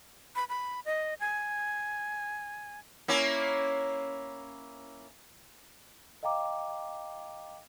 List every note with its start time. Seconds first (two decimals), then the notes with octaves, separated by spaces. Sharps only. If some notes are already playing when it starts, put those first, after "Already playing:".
0.36 B5
0.49 B5
0.85 D#5
1.20 G#5
3.08 A#3 C#4 E4
6.23 D#5 F5 G5 A#5 D6